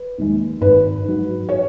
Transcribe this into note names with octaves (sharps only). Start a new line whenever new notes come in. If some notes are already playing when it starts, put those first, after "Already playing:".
Already playing: B4
D#2 D#3 G#3
G#1 B4
G#2 F#3
C#5